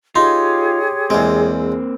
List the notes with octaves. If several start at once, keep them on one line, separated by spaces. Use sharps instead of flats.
D#4 F4 G4 G#4 C#5 C6
E2 G#3 A#3 C4